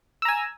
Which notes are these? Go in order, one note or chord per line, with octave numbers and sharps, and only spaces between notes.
G#5 A#5 E6